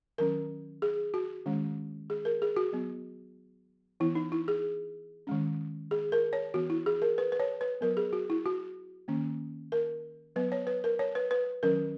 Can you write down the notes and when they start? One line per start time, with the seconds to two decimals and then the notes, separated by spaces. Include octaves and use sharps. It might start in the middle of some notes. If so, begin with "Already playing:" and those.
0.18 D#3 F#3 C#4 A#4
0.82 G#4
1.14 F#4
1.46 D#3 G#3 C#4
2.10 G#4
2.25 A#4
2.42 G#4
2.57 F#4
2.73 F#3 B3
4.00 E3 B3 E4
4.15 D#4
4.32 E4
4.48 G#4
5.27 D#3 G#3 C#4
5.91 G#4
6.12 A#4
6.33 C#5
6.54 E3 B3 F#4
6.70 E4
6.86 G#4
7.02 A#4
7.18 B4
7.32 B4
7.40 C#5
7.61 B4
7.81 F#3 B3 A#4
7.97 G#4
8.13 F#4
8.30 E4
8.46 F#4
9.08 D#3 A#3 C#4
9.72 A#4
10.36 F#3 B3 B4
10.52 C#5
10.67 B4
10.84 A#4
10.99 C#5
11.15 B4
11.31 B4
11.63 D#3 F#3 C#4 A#4